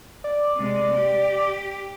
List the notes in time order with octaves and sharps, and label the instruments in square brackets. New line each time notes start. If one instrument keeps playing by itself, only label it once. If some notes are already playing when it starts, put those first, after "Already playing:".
[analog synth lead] D5
[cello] C3 G#3
G4